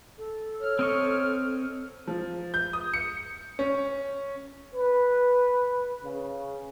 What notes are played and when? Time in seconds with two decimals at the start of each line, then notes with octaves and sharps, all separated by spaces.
0.18 A4
0.60 C#5 F6
0.79 C4 D#5 C#6
2.07 F3
2.54 G6
2.73 D#6
2.93 C#7
3.59 C#4
4.74 B4
6.04 C#3